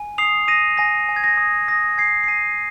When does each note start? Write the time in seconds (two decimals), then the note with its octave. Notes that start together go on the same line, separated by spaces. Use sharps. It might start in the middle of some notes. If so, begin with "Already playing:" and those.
Already playing: G#5
0.18 D#6 C7 F7
0.47 D#6 A#6 D#7
0.77 G#5 A#6
1.09 G#5
1.16 G#6
1.24 A#6
1.37 D#6
1.68 D#6 A#6
1.98 G#5 G#6 C7
2.23 C7
2.28 G#5 A#6 D#7